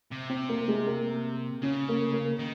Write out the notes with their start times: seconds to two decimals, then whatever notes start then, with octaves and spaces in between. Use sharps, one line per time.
0.11 C3
0.29 C4
0.49 A#3
0.68 G#3
0.87 A#3
1.62 C#3 C#4
1.89 A#3
2.13 A#3
2.39 D#3